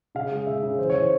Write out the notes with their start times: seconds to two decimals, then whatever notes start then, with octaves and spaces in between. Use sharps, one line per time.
0.15 C#3 F5
0.31 G#3
0.46 C#3 E5
0.63 C#3
0.79 E3 C5
0.90 E3 C#5
1.02 C5